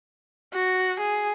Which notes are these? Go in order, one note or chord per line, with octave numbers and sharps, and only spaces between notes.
F#4
G#4